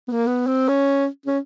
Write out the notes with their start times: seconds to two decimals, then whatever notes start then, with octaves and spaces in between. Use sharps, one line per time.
0.08 B3
0.12 A#3
0.26 B3
0.47 C4
0.69 C#4
1.26 C#4